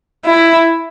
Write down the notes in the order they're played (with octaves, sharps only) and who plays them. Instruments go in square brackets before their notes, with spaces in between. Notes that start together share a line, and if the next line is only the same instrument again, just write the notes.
[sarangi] E4